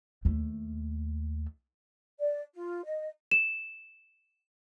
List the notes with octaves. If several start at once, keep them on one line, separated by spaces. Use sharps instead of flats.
D#2 A3
D5
F4
D#5
E7